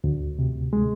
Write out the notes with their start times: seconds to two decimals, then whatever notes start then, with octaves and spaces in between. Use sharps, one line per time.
0.04 D2
0.39 C3
0.73 G#3